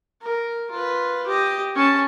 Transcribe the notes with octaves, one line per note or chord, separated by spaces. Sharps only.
A#4
F4 B4
G4 D#5
C#4 A5